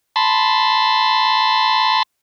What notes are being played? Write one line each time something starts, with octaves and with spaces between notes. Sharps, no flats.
A5 B5 C6